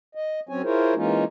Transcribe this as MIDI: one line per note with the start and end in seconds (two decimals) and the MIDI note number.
0.15 0.40 75
0.49 0.62 54
0.49 0.62 60
0.49 0.62 61
0.49 0.62 73
0.49 0.62 80
0.63 0.94 64
0.63 0.94 65
0.63 0.94 68
0.63 0.94 70
0.63 0.94 72
0.63 0.94 73
0.95 1.24 52
0.95 1.24 56
0.95 1.24 58
0.95 1.24 61
0.95 1.24 63
0.95 1.24 65